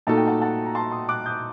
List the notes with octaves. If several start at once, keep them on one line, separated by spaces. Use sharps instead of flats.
A#2 A3 D#4 F#4 A4 A5
G5
F#5 A5
F#5 A5
A#5
A5 C6
C6 D#6
D6 F#6
D#6 G6